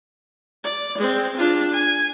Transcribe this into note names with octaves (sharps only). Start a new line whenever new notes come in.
D5
G#3 C4
D4 F4
G#5